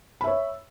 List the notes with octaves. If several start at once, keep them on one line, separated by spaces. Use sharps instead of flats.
C#5 E5 B5